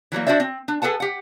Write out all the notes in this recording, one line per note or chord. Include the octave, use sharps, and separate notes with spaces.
E3 F#3 G3 A#3
D4 F#4 C5 D5 E5
C4
D4
G#4 A4 B4 F#5 A5
G4 F#5